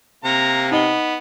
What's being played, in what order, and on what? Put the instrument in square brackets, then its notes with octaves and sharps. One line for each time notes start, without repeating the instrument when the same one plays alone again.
[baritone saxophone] C3 [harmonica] A#3 A#5
[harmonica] B3 [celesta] D#4 D#5 G7